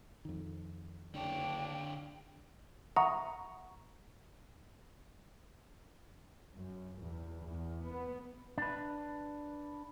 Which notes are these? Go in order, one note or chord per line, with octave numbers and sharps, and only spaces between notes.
F2 D#3
F#1 D3 D4 C#5 G5
E5 F#5 A#5 B5 C#6 D#6
F#2
E2
E2
B3
D4 B4